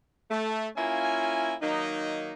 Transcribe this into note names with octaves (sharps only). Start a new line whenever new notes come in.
A3
A#3 C#4 E4 F4 G#5
D#3 F#3 A#3 D#4